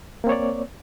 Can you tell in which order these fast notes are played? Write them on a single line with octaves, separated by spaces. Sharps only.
A#3 C4 C#5 D5